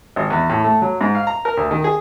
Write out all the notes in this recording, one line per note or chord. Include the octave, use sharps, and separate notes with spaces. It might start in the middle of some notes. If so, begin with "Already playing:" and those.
G#1
E2
A2
A3
F#3
G#2
F5
A#5
A#4
D2
D#3
G#4